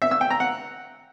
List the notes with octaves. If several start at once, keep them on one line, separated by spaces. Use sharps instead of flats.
E5
E6
G5
A#5
F#5